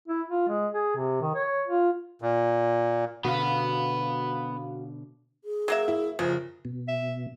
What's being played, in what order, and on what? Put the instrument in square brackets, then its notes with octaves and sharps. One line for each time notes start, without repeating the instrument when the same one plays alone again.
[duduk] E4
F4
G#3
G#4
C3
D#3
C#5
F4
[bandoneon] A#2
[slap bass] B2 D3 [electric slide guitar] B3 B4 [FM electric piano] F#4 F5
[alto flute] G#4
[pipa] F#3 A#3 E5
[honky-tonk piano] E4
[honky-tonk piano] F#1 F3 [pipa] C#3
[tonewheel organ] B2
[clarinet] E5